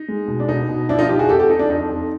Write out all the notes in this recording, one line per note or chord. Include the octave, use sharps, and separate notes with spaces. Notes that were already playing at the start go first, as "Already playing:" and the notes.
Already playing: D#4
G#3
B2
D4
B2 D#4
B2
F3 D4 E4
D#4 F4
F3 F4 G4
F#4 G#4
F2 G4 A4
G4 A4
F3 D#4
D4
F2 D#4
F2